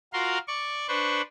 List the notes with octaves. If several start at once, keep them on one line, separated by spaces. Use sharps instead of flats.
F4 F#4 A#4 F5 C6
D5 C#6
D4 B4 C5 C#6